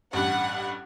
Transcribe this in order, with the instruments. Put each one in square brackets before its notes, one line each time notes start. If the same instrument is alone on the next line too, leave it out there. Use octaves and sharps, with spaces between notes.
[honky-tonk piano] A1 G2 [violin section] F#5